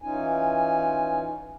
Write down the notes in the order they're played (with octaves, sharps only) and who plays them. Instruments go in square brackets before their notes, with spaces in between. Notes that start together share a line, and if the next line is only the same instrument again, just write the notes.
[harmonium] E3 C#4 D#4 F4 G#5